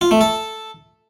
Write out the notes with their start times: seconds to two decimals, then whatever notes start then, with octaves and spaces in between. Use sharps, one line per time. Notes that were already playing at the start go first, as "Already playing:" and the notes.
0.01 F4
0.11 A3
0.21 A4